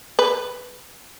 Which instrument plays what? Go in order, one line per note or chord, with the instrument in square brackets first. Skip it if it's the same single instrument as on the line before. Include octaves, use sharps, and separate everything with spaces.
[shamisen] B4